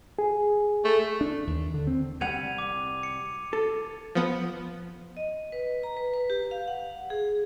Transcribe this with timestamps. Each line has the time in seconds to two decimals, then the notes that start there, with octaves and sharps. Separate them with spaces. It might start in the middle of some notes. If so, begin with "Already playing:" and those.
0.19 G#4
0.85 A3
1.21 D4
1.47 D#2
1.74 D3
1.87 C4
2.21 C2 G3 F#5 G#6 D#7 F7
2.58 D6
3.03 C#7
3.53 A4
4.15 F3 B3
5.17 D#5
5.52 B4
5.83 A#5
5.97 B4
6.14 B4
6.30 G4
6.51 F5
6.68 F#5
7.10 G#4